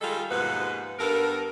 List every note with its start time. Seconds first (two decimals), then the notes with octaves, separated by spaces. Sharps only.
0.01 D#3 G3 G#3 F4 A4
0.30 D#2 G#2 B2 F3 B4 F#5
0.99 G2 B3 A4 A#4